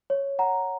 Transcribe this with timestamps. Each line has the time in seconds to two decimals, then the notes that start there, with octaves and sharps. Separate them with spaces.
0.10 C#5
0.39 F#5 A#5